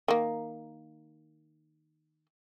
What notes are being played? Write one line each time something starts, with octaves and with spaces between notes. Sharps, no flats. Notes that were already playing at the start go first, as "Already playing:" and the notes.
D#3 A#3